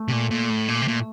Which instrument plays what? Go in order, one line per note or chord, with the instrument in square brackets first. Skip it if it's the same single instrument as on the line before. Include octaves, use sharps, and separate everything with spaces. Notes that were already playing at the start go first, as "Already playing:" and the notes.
Already playing: [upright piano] A3
[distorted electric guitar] C3
A#2
A#2
A2
A#2
C3
A#2